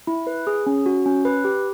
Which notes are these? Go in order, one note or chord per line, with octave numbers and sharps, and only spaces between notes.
E4
B4
G#4
C#4
F#4
C#4
B4
G4